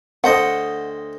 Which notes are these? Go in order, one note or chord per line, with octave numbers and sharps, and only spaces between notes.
D2 C5 D#5 F#5